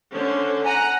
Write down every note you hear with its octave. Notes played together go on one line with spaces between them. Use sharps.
D3 C#4 C5
F#5 G#5 A#5